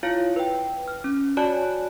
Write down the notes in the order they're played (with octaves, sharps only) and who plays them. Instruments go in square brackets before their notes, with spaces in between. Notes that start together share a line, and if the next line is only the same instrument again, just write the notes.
[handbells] E4 F4 C#5 F5
B4 G5
F6
C#4
F#4 C#5 D5 G#5 A5 F#6